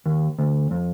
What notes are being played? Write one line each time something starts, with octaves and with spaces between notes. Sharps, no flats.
D#2
D2
F2